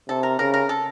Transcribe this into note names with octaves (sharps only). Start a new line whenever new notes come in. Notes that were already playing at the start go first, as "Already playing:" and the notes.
C3 A4
A#4
C#3 A#4
A#4
A4